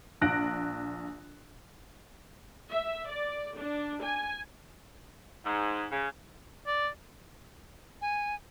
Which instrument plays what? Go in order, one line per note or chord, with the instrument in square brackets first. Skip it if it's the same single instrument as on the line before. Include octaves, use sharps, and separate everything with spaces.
[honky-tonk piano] A#1 F#6 A#6 D7
[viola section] E5
D5
D4
G#5
[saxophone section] G#2
C#3
[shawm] D5
[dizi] G#5